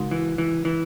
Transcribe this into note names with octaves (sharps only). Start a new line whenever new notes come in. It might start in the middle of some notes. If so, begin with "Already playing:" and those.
Already playing: C#3 G#3 D#4 F#4
E3
E3
E3